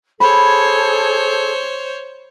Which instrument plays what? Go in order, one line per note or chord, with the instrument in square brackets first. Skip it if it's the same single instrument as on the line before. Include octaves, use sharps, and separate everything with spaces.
[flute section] G#4 A4 [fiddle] C5 C#5 [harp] B5